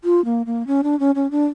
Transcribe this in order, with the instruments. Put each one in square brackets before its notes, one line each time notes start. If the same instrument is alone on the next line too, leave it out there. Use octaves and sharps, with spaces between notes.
[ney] F4
A#3
A#3
C#4
D4
C#4
C#4
D4